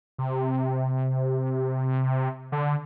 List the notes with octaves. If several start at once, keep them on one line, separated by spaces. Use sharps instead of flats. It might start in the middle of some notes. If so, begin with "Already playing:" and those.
C3
D3